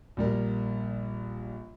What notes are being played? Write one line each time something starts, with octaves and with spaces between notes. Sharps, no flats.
A#1 G3 A#4